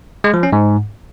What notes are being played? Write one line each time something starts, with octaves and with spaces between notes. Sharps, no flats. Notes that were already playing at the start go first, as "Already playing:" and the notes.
G#3
F3
C#4
G#2